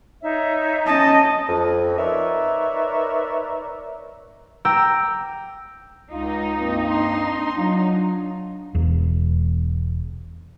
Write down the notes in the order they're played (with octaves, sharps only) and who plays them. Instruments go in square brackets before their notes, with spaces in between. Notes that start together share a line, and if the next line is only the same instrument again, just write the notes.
[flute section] D#4 C#5 E5
[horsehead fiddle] C#4 D#5 [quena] A5
[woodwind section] F2
D#4 A#4 B4 C#5 D5 E5
[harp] G5 A#5 D6 E6 G6
[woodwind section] C#2 [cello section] D#4 [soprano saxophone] F4
[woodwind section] G2 A#3 C4
[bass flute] D4 [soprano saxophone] C6
[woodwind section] F#3 [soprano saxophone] F4
[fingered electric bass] E1 E2